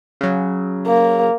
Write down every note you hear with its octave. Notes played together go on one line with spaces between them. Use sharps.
C#3 F#3
A#3